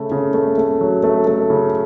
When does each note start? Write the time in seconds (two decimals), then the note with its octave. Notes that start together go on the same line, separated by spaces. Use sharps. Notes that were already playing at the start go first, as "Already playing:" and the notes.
Already playing: C#3 A3
0.11 C#3
0.34 A3
0.58 A3
0.81 F#3
1.04 A3
1.27 A3
1.50 C#3